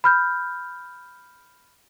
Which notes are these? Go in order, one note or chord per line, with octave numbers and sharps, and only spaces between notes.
B5 F6 G6